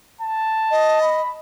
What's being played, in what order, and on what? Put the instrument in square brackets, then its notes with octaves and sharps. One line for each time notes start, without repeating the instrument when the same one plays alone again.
[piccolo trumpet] A5
[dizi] D#5
[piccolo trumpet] B5